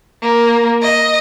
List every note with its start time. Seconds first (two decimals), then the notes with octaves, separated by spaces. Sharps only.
0.22 A#3
0.82 D#5